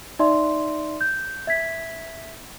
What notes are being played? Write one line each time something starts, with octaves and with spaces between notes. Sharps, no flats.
D#4 D5 E5 C6
G6
E5 G#6 B6